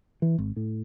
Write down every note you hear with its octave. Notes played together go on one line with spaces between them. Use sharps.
E3
G#1
A2